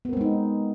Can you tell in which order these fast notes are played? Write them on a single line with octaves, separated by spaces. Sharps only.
B3 A#4 C4 G#3 D#4